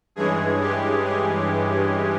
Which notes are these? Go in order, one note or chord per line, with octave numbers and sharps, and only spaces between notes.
G2 E3 G#3 C#4 G#4
G4
G#4